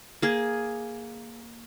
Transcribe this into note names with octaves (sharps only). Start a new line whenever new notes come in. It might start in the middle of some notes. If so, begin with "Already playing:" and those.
A#3 G#4